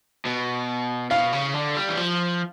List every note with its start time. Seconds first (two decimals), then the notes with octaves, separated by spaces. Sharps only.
0.25 B2
1.11 B2 F5
1.32 C#3
1.54 D3
1.76 G3
1.89 E3
1.97 F3